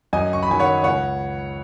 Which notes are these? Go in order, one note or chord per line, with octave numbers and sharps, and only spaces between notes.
F#2 D#5 G#5
C#6
B5
D#3 F#3 G#5
C#5 F#5
C#2 C#5 F#5